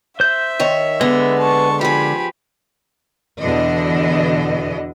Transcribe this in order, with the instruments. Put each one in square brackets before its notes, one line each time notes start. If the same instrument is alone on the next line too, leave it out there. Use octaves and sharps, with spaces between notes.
[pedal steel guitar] C5 G6 [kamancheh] E5
[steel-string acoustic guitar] D#3 A#4 C#5
[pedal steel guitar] D3 G#3 [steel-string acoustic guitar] B3
[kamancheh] A5 C#6
[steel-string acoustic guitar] F3 G#4 [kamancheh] G4 B5
[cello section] E2 B2 D3 E3 D4 D#5